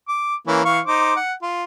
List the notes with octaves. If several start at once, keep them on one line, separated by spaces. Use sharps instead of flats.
D6
E3 A#3 C#4
E3 F5 C#6
D#4 C5 D6
F#5
F4